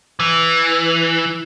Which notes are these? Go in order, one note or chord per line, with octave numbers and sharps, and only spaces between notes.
E3